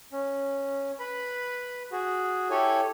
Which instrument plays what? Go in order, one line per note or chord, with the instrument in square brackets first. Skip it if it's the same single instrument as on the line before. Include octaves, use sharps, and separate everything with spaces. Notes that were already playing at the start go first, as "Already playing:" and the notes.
[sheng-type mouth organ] C#4
B4 B5
F#4 G#4
E4 G4 A4 C#5 G#5